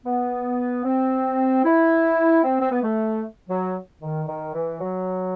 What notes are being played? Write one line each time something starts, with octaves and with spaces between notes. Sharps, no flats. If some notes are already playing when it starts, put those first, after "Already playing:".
B3
C4
E4
C4
C4
B3
A3
F#3
D#3
D#3
E3
F#3